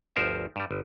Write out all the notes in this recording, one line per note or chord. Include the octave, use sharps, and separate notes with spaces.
G1 D2 F3 A#4 C5 E5
G2 G3
G1